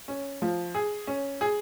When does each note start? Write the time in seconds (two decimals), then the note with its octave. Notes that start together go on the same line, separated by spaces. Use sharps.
0.08 C#4
0.42 F3
0.75 G#4
1.07 C#4
1.41 G#4